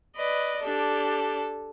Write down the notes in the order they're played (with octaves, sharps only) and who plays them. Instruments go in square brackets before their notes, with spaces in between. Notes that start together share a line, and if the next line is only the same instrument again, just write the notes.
[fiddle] B4 D5 [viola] D#5
[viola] D4 G4 [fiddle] A4